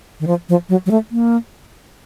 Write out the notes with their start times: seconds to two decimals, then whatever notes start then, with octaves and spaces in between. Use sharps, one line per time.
0.20 D#3
0.27 F3
0.49 F3
0.69 F#3
0.86 F#3
0.91 A3
1.11 A#3